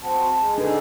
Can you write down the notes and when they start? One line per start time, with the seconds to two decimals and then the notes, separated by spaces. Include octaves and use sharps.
0.03 C4 F#4 A5
0.40 G#3
0.58 D3 D4 D#4 G#4 A4 B4